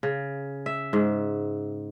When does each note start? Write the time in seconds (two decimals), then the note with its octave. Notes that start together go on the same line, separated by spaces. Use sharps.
0.03 C#3
0.66 E5
0.93 G#2